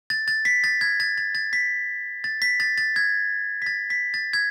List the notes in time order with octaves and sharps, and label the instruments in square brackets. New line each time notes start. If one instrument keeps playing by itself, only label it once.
[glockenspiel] A6
A6
B6
A6
G#6
A6
A6
A6
B6
A6
B6
A6
A6
G#6
B6
A6
B6
A6
G#6